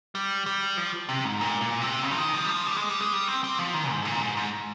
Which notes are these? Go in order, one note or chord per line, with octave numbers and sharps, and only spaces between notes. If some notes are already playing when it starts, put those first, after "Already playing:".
G3
G3
F3
C3
G#2
A#2
A#2
C3
C#3
F3
D#3
F3
G3
F3
G3
G#3
G3
G#3
G3
C4
C4
F3
D#3
G#2
A#2
G#2
G#2